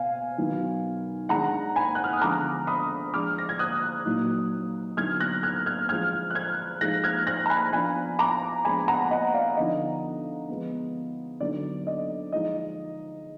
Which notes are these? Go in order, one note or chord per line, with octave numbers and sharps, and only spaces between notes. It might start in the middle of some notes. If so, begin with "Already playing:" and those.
Already playing: B2 B3 F5 G#5
D#3 F#3 B3
D#3 G#3 D4 F#5 A#5
G#5 B5
F#6
F6
D#6
D3 F3 G#3 B3 A#5 D6
B5 D#6
F3 G#3 D4 D6 F6
A#6
G#6
D#6 F#6
A#2 F#3 A#3 D#4
D3 F#3 B3 D#4 F6 G#6
F#6 A#6
F6 G#6
F6 G#6
F3 G#3 D4 F6 G#6
F#6
F6 G#6
F3 G#3 D#4 F#6 A#6
F6 G#6
F#6 A#6
A#5
G#5 B5
F3 B3 D4 G#5 B5
A#5 D6
F3 G#3 B3 D4 G#5 B5
F#5 A#5
D#5 F#5
D5 F5
D3 F3 B3 D#4 D#5
F3 G#3 B3
D3 F#3 B3 D#4 D5
D#5
F3 G#3 D#4 D#5